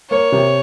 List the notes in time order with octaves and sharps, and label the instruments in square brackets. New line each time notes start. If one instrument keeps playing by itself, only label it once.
[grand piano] A#3 [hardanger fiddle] C#5
[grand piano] C3